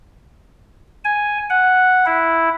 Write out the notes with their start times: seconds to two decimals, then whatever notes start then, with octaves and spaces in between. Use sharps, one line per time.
1.05 G#5
1.50 F#5
2.06 E4